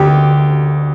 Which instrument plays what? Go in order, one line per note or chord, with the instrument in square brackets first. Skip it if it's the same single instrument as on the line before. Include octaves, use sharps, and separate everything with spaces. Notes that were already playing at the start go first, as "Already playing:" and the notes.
Already playing: [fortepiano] D2 G4